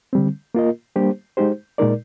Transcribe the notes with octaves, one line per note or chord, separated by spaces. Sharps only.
D3 G3 C4
A#3 F4 A#4 D#5
G3 A#3 D4 G4 C5
G#3 D#4 G4 C5
A#2 G#3 D#4 A#4 D5